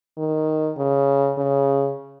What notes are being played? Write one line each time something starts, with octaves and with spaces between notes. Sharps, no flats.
D#3
C#3
C#3